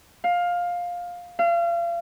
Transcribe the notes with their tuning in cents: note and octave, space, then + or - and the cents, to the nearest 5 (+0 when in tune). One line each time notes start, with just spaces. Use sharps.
F5 +15
F5 -35